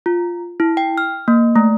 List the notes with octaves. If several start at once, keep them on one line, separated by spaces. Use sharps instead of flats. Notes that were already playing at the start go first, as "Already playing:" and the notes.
F4
E4
G5
F6
A#3
A3